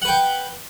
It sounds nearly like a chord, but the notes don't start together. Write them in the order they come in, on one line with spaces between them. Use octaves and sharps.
F#5 B4 G5